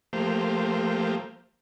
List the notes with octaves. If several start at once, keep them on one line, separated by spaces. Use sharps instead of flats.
F3 A3 A#3 G4 C5